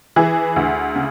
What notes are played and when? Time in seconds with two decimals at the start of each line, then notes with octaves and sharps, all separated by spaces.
0.16 E3 E4 G#4
0.56 D2
0.96 C#3